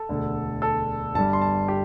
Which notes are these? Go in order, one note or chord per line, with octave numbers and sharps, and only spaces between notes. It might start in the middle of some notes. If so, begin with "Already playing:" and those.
Already playing: A4
E1 D2 D3
A4
G1 G2 G3 A5
C6
A5
G4